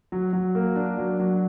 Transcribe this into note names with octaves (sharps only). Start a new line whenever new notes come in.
F#3
F#3
A#3
D4
F#3
F#3